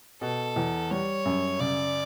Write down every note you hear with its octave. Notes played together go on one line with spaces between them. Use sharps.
B2 A4
E2
G3 C#5
F#2
C#3 D5